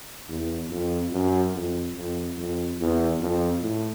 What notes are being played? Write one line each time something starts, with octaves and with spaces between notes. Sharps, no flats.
E2
F2
F#2
F2
F2
F2
E2
F2
A2